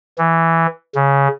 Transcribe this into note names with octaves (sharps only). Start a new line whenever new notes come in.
E3
C#3